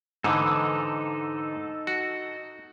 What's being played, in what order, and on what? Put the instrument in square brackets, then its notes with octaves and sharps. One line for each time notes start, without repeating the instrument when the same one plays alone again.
[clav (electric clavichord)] G#2 D3 E3 [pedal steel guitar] D#4 A4
[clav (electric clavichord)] F#4